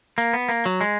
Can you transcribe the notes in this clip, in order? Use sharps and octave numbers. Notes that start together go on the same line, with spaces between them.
A#3
B3
A#3
F#3
G#3